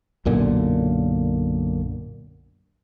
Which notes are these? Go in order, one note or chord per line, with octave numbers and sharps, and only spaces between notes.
B1 F#2 A#2 D3